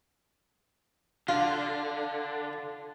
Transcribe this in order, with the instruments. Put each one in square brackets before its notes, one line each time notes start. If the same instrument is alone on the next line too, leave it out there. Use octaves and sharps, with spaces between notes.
[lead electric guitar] D3 [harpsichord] F4